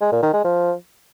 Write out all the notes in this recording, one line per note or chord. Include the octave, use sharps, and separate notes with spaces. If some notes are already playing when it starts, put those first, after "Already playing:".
G#3
A#2
D#3
G#3
F3